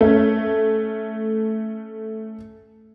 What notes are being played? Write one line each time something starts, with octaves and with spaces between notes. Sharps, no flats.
A3 C#4